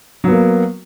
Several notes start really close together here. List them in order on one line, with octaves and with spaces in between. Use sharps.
F#3 B3 A#3